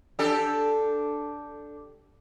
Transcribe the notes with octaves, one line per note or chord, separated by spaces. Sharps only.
D4 G4 A4